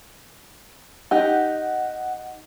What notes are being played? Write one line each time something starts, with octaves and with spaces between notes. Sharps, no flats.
D#4 G4 F#5